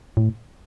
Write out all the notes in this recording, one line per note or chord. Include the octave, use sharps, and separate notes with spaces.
A2